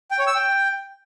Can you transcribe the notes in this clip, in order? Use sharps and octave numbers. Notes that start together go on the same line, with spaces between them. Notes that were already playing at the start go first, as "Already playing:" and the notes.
G5
C#5
E6
G5